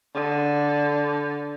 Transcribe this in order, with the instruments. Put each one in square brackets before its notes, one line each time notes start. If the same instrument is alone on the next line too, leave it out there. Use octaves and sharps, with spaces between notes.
[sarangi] D3